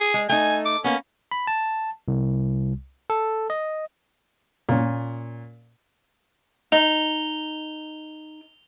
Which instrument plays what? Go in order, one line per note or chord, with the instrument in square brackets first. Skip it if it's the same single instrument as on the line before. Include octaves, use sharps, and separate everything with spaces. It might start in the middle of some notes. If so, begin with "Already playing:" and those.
[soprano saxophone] G#4
[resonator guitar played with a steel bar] G#3
[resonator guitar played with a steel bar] A3 D#4 [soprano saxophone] G#5
[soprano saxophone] D6
[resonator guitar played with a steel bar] A#3 B3 [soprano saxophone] C#4
[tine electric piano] B5
A5
C2
A4
D#5
[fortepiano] A#2 C#4
[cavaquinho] D#4 [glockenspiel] F7 G7